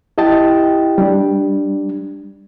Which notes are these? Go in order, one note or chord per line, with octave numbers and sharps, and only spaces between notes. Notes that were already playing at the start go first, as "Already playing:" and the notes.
E4 G4 D#5 G5 A5
G3 D4